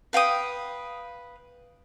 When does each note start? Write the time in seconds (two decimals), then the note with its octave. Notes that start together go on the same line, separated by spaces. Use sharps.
0.13 B4 F5 G5 D#6